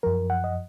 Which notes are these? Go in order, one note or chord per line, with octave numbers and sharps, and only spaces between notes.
F#2 F3 A#4
F#5
D#5